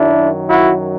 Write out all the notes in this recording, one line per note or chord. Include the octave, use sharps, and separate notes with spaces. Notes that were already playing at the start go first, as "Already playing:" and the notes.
Already playing: F#2 D#3 F#3 D4 E4
E4 F#4